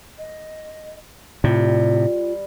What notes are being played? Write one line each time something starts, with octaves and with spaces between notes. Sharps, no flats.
D#5
A2 C3 G3 F4